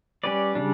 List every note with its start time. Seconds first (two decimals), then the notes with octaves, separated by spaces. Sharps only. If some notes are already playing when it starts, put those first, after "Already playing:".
0.24 G3 C#4 G4 B4 D5
0.55 C#3 G3 D4